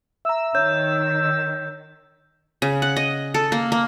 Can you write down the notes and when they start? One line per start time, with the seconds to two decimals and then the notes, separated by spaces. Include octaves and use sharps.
0.25 E5 A#5 E6
0.55 D#3 C#5 G6
2.62 C#3
2.82 F#5
2.96 D#5
3.34 A4
3.52 A#3
3.72 A#3